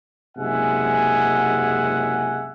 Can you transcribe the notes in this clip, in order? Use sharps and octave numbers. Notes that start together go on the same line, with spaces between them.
F#1 C3 G#3 E5 F#5 G#5